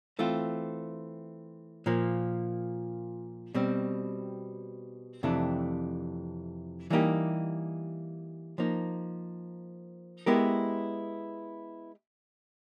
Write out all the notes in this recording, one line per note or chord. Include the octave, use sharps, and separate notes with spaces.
E3 A3 C4 F4
A#2 F3 A#3
B2 G3 C4
F2 C3 E3 A3 D4
E3 G3 A#3 D#4 G4
F3 A#3 D#4
G#3 B3 E4 G4 A#4